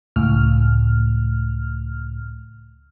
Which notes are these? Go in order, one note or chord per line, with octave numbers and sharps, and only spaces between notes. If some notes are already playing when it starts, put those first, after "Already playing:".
C#2 A2 F6